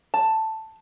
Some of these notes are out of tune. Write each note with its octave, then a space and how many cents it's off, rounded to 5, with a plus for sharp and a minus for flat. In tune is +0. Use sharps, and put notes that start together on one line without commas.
A5 +5